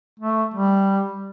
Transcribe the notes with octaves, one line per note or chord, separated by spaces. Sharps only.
A3
G3